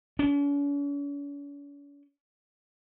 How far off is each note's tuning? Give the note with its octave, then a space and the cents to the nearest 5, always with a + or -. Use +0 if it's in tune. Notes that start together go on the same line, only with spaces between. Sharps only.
C#4 +45